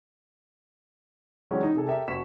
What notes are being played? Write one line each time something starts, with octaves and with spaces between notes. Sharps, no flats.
E3 F#3 G#3 C#4 D4 G4
D#4
C3 G#4 A4
G4 A4 A#4 E5
F#1 F#4 C#6 B6 E7